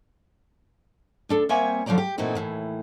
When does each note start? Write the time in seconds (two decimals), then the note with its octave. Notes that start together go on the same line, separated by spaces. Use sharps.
1.29 D2 D4 A4
1.49 G3 A#3 C4 C#5 E5 G#5
1.86 D3 F3 F#3 C4 D5 A#5
1.98 G4
2.18 A#2 E3 A3 C4 D#4 F#4
2.35 D#2 A2 E3